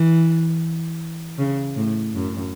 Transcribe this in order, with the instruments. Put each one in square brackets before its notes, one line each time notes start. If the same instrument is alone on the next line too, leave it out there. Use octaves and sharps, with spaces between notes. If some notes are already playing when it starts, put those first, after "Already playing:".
Already playing: [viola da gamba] E3
C#3
A2
F#2